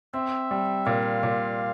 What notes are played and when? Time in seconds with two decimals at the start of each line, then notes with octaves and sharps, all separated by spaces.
0.14 C4 E5
0.51 G3
0.86 A#2 F5
1.23 A#2